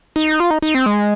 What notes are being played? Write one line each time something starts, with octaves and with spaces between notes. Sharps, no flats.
D#4
F4
D#4
D#4
C4
G#3